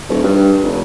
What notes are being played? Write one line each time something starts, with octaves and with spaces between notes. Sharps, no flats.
D#1
G2
F1